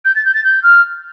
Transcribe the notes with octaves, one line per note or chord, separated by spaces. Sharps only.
G6
A6
G6
A6
G6
F6